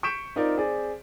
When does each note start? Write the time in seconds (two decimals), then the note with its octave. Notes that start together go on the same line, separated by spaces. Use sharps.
0.03 C#6 G6 B6 D7 E7
0.36 C4 D#4 F4 A#4 D5
0.56 C4 G#4 D5